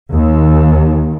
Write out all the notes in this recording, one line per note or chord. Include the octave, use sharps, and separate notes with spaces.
D#2